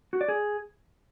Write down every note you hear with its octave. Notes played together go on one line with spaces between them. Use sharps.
F#4
D5
G#4